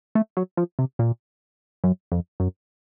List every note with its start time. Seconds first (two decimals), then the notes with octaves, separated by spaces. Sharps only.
0.15 A3
0.37 F#3
0.57 F3
0.79 C3
0.99 A#2
1.84 F#2
2.12 F2
2.40 F#2